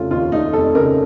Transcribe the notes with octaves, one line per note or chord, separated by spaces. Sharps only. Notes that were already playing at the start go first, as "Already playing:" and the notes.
Already playing: F1 C#3 A3 F4
D#2 F4
A3 D#4
F1 A4
C#3 A#4